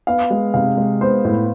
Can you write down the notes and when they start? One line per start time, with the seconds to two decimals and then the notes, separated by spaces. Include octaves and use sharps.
0.07 B3 F5
0.30 G#3
0.54 C3 F5
0.77 G#3
1.01 B3 C5
1.25 A2